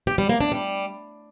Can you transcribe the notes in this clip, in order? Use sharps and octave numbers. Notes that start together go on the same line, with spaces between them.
G4
G3
A#3
D4
G3